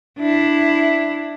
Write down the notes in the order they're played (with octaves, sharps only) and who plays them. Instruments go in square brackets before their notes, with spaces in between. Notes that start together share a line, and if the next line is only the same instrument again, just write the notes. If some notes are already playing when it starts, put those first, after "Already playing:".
[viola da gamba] D4 E4